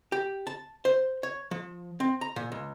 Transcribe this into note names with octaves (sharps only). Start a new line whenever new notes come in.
G4
A5
C5
C#5
F3
C4
A#5
A#2
C#2